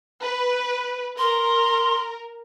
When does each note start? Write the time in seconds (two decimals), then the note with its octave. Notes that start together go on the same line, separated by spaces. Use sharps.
0.22 B4
1.18 A#4 C6